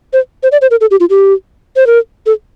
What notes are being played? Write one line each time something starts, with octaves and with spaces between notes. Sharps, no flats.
C5
C5
D5
C5
A#4
A4
G4
F4
G4
C5
A#4
A4